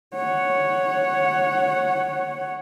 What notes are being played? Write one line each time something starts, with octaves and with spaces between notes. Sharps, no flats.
C#5 F#5